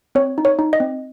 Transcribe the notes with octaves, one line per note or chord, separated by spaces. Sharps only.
C4 C#5
D#4
C#5
D#4
D#5
C4